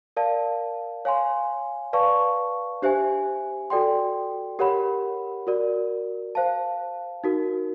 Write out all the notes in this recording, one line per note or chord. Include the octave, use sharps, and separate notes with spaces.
A#4 D5 F5 A5
C#5 F5 G#5 C6
B4 D5 F5 A5 C#6
D4 G4 C5 E5 G#5
F#4 A4 D5 G5 C6
G4 A#4 C#5 F#5 B5
F#4 A#4 D5
C5 F5 A5
D#4 F#4 A#4